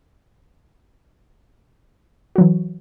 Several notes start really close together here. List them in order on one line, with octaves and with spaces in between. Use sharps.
F#4 F#3 E3